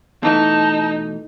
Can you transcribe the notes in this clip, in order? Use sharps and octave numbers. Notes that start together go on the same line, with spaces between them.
B2 E3 A3 D#4 A5